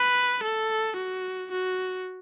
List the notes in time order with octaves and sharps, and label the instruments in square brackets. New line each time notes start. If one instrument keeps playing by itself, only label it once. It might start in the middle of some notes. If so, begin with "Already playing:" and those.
Already playing: [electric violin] B4
A4
F#4
F#4